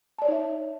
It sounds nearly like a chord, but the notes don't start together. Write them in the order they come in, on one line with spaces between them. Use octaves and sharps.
A5 D5 C#5 D#4 E5